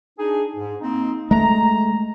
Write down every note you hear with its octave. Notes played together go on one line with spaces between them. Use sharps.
D4 D#4 G#4
G#2
A#3 C4 D#4
G#3 A3 A#5